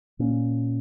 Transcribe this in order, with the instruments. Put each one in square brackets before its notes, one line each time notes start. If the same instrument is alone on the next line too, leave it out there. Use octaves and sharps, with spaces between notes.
[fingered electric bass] A#2 A#3 C#4